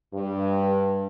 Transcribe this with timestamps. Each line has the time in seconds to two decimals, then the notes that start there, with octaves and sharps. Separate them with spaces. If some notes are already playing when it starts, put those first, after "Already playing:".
0.13 G2